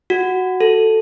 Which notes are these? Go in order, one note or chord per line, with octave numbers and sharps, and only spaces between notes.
F#4
A4